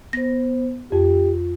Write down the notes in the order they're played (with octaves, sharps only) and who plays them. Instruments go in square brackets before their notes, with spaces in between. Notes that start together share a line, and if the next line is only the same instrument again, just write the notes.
[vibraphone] B3 C5 [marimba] A#6
[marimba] F2 [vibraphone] F4 [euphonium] G4